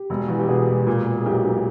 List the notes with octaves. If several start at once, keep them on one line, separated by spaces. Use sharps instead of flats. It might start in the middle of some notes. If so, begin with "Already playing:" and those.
Already playing: G4
E1
E2
G4
B2 G#4
E1
A#2
A#2
G#4
B1 G4
B1